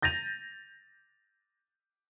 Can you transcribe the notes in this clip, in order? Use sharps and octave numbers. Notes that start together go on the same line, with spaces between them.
G6 A6 A#6 D#7 F7